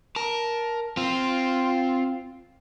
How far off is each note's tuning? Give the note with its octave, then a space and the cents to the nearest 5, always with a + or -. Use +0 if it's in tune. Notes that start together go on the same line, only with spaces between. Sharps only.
A#4 +10 A5 +0
C4 +0 F4 +0